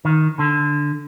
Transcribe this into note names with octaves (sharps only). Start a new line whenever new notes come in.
D#3
D3